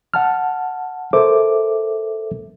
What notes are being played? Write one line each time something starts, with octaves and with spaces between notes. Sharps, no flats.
F#5 A5 F6
A4 A#4 C5 E5 D6